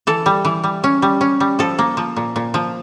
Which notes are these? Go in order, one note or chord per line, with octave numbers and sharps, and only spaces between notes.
E3 A4
G3
E3
G3
C#4
G3
C#4
G3
F3 A4
A#3
F3
A#2
A#2
F3